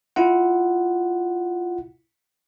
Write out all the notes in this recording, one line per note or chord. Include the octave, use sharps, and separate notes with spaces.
E4 F4 F#5